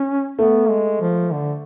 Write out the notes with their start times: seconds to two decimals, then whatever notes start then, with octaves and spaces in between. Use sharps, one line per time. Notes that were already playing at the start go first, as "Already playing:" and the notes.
Already playing: C#4
0.38 A3 B3
0.69 G#3
1.01 F3
1.32 D3